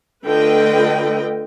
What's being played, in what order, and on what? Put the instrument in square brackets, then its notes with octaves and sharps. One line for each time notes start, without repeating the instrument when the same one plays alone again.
[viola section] D3 A3 F4 B4 D#5 G5